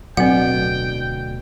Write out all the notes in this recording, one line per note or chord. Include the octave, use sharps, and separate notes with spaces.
D1 B2 D3 F#3 C4 F#5 G5